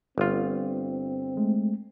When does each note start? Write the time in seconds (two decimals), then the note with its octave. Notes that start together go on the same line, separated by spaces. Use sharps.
0.18 G1 C4 F4
1.37 G#3 A3